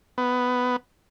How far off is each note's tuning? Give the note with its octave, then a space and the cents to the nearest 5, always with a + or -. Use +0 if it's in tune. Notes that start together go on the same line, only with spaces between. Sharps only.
B3 +10